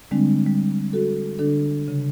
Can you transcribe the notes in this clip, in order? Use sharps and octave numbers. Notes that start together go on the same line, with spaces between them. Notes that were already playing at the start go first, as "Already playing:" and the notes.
D3 G3 G#3 C4 D4
G3
F#4 A4
D3 D4 A4
C#3